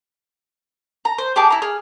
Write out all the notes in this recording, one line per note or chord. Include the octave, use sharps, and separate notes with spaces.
A#5
C5
G4 G#4 A5 D6
E4 A#5
G#4 F6